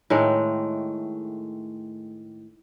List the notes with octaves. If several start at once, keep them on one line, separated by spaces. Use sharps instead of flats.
A2 D#3 G#3 A3